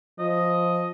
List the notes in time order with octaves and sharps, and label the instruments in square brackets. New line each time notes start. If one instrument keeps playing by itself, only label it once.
[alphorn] F3 [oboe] D#5